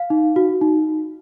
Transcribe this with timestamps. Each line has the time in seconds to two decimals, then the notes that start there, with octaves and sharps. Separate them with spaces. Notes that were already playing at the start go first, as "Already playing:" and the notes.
Already playing: F5
0.10 D#4
0.36 F#4
0.62 D#4